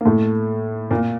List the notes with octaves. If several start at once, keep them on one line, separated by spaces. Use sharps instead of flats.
A#3
A2 A3
A#2 A#3